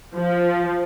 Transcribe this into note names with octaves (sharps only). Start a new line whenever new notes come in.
F3